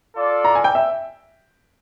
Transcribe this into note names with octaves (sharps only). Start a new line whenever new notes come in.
F4 A4 D5
A#5
G#5
G5
E5